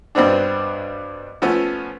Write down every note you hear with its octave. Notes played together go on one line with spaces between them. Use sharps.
G2 B2 B3 C4 D4
F3 A3 B3 C#4